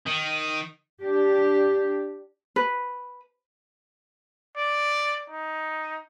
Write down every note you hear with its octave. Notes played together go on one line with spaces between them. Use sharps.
D#3
D4 G4
B4
D5
D#4